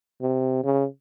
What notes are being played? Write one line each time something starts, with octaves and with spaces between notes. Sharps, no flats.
C3
C#3